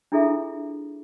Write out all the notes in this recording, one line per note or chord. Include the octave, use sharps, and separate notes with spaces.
D4 E4 F4 G#4 A4 E5